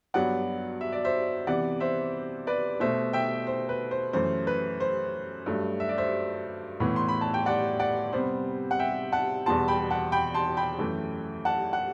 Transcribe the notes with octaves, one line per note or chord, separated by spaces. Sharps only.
G2 F#3 B3 D5 F#5
E5
D5
C5 E5
C3 E3 B3 D5 F#5
C5 E5
B4 D5
B2 A3 C5 E5
E5 G5
C5
B4
C5
F#2 E3 A3 C5
B4
C5
G2 F#3 A3
E5
D5
C5 E5
A2 E3 B3
C6
B5
A5
G5
D5 F#5
D5 F#5
C3 G3 B3 C5
F#5
E5 G5
F#5 A5
E2 B2 G3 B3 A5 C6
G5 B5
F#5 A5
G5 B5
A5 C6
G5 B5
F#2 E3 A3
F#5 A5
F#5